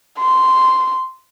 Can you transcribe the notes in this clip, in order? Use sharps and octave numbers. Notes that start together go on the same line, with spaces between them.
C6